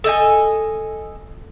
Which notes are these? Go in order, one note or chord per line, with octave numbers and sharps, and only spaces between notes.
A4 D#5 G5 G#5